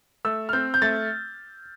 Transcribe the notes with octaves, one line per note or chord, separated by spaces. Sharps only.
A3 E6
F6
C4 G6
G6
A3 A6